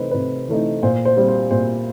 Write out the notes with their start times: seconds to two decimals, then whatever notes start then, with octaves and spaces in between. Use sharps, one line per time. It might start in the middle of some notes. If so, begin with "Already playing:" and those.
Already playing: C3 E3 A3 C4 D#4 B4
0.11 C3 B4
0.49 E3 A3 C4 D#4
0.83 A#2 C5
1.05 C5
1.17 G3 C4
1.28 C5
1.51 A#2 C5